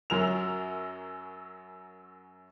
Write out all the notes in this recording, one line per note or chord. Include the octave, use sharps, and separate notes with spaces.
F#2 F#3 C#4 A#4 E6 F7